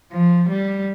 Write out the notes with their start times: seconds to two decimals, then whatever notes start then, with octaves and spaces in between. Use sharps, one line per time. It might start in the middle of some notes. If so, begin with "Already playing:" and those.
0.11 F3
0.49 G3